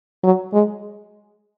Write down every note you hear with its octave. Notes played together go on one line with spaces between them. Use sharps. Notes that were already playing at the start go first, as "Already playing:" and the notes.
F#3
G#3